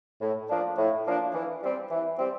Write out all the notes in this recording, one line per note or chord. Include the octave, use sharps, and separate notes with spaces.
A2
F3 A#3 D4
A2
F3 A#3 D4
E3
G3 C4
E3
G3 C4